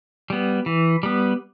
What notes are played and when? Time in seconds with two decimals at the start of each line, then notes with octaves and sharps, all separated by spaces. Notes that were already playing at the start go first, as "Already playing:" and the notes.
0.30 G3 B3
0.66 E3
1.03 G3 B3